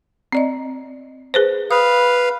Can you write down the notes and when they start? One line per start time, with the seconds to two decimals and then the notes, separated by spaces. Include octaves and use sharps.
0.32 C4 D5 D#5
1.34 G#4 B4 C5
1.71 B4 F5 D#6